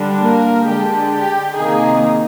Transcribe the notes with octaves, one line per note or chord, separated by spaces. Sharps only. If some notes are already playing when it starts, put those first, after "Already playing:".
Already playing: D3 G3 D4
A#3 A#4
D3 G#3 D4 G4
G4
C3 D#3 A#3 D#4 G#4